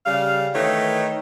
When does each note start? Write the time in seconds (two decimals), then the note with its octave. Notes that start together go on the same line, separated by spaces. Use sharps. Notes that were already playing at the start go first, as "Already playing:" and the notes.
0.06 C#3 G3 F5
0.55 D#3 E3 A3 D#4 C#5